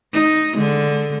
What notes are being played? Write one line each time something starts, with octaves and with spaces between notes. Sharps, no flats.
D#4
D3 G#3